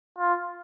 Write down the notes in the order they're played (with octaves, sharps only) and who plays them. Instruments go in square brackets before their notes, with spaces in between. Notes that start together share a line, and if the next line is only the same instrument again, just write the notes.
[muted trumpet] F4